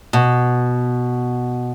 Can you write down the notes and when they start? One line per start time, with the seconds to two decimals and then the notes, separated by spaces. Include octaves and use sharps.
0.13 B2